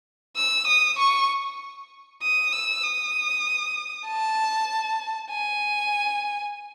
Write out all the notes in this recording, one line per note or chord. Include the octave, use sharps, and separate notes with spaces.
E6
D#6
C#6
D#6
E6
D#6
A5
G#5